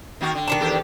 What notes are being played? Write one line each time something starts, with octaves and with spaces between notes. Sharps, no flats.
D#3 A#3 F#4
D3
D#3 D4 A5
E2 G4 A4